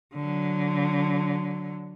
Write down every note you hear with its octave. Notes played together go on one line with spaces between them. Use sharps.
D3 F#3